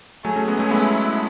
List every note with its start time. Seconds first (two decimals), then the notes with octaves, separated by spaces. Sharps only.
0.25 F#3 A3 G#4
0.36 A3 C#4
0.48 G#3 B3
0.59 A3 C#4
0.70 G#3 B3 E4